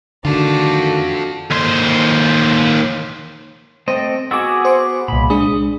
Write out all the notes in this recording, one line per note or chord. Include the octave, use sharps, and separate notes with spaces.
D3 D#3 A3 D4 F4 F#4 A4
D#2 C5
A3 C4 C5 D#5
B3 F#4 G#4 D6 E6
C5 C6 D6
C2 A#2 B5
G#3 D4 G#4 D#6